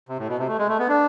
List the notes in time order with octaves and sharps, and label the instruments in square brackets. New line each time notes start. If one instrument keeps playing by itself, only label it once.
[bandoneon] C3
A2
B2
C3
A3
G#3
A3
B3
D4